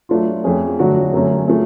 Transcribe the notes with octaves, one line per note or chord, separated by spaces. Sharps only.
F#3 A3 D4 F4
F2 F3 A3 C#4 G#4
D3 F#3 A3 D4 F#4
F#2 D3 F#3 A3 C#4
F3 A3 C#4 G#4